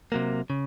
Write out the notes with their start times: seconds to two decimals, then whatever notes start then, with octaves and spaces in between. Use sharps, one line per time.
0.12 C3 F#3 A#3
0.50 C#3